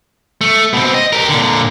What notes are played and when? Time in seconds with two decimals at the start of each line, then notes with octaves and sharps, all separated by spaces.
0.41 A3
0.73 B2 C4
0.94 D#5
1.13 G4 A#4
1.29 A#2 D3